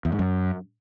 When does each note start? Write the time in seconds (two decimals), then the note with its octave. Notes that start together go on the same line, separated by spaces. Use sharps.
0.05 E2
0.12 G#2
0.19 F#2